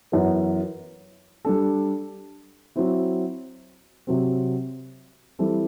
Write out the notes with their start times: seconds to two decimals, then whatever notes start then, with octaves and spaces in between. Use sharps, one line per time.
0.12 F#2 E3 B3
1.45 G3 D4 A4
2.76 F#3 C4 E4
4.07 C3 F#3 C4
5.39 E3 G3 C4 E4 A4